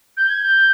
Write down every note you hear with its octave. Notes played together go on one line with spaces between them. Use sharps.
G6
G#6
G6